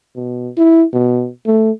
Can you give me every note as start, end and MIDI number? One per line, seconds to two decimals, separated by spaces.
0.15 0.50 47
0.57 0.85 64
0.93 1.29 47
1.46 1.71 57